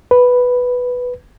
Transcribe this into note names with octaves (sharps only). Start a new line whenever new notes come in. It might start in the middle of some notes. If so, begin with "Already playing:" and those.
B4